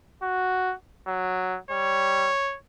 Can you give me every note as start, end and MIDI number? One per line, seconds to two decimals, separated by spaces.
0.22 0.74 66
1.07 1.58 54
1.71 2.30 55
1.71 2.57 73